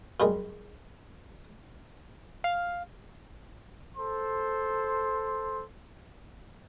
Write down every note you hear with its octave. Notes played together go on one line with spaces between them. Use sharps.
F#2 G3 G#3
F5
A4 C5 C6